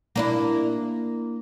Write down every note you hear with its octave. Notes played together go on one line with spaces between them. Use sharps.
A#3 D4 E4